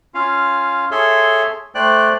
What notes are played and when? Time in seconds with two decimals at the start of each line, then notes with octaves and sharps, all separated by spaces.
0.14 C#4 F4 F5
0.91 G#4 A4 C#5 E5 C6
1.75 A3 C5 D5 G5 F#6